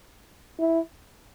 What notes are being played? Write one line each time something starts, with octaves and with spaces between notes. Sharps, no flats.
E4